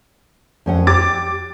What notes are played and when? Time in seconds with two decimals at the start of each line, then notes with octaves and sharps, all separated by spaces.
0.66 F2 C#4 F#5
0.87 G4 D6 A6